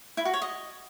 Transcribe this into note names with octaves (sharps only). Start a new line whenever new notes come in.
E4
F#4
C#5
D#5